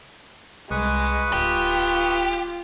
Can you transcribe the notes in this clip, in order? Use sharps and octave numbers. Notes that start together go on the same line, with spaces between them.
C2 G#3 B4 C#6 D#6
D1 F4 G4